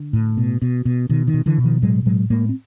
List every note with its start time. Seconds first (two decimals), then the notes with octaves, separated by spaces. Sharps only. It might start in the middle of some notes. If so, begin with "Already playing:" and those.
Already playing: D3
0.13 A2
0.37 B2
0.62 B2
0.85 B2
1.09 B2 D#3
1.27 D#3
1.34 B2
1.46 D3 E3
1.58 B2
1.64 D#3 F3
1.82 A2 F#3 G#3
2.06 A2 F#3 G#3
2.30 A2 G#3 A#3
2.49 C4